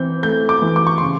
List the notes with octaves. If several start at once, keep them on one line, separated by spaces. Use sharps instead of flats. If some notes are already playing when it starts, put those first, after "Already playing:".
Already playing: E3 C4 G6
A3 G6
D6
E3
D6
C#6
C#3 C6